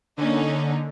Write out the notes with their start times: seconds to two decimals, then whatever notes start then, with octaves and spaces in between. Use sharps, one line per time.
0.18 D3 A#3 C#4 D#4